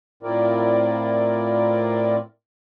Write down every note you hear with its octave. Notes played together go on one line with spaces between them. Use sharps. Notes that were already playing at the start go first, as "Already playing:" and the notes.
A2 C4 E4 F4 A#4 D5